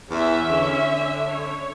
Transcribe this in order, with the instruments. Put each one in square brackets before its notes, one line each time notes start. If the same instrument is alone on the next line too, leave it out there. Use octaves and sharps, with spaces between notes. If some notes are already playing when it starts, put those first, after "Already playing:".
[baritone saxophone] E2 [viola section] C#4 E5
[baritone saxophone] D3
[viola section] C#5